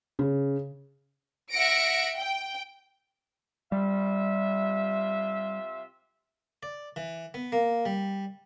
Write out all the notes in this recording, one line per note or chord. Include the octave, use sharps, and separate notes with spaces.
C#3
E5 F#5 A#6 C#7 D7
G5
C3 G3 F4 E5
D5
E3
B3
A#3
G3